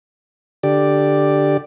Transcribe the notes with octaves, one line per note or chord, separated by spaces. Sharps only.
D3 G4 D5